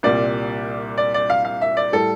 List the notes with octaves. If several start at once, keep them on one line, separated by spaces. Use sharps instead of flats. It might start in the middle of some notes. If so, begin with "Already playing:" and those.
C2 A#2 G3 D5
D5
D5
F5
F5
E5
D5
A2 G3 A4